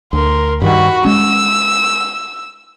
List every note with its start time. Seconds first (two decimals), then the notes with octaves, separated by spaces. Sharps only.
0.13 D2 A#4 C6
0.62 G2 D#3 F#4 B5
1.05 G#3 C#4 E6